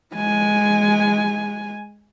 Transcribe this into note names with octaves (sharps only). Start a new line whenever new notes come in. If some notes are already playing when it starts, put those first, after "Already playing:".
G#3 G#5